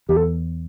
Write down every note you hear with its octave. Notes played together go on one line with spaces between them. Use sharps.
E2 G4
A4